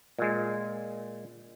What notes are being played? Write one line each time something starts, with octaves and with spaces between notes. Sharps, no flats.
A#2 G#3